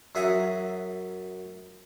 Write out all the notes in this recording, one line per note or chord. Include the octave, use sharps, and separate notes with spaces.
F#2 G#4 E5 F#5 G#5 A#5